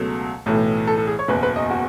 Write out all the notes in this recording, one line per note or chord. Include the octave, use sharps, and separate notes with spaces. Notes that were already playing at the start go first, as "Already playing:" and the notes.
Already playing: C#2 B2 F#3 A3
B1 A2 E3 A3
A4
A4
G#4
C#5
F#1 E2 B2 B4
B4
D#5
F#4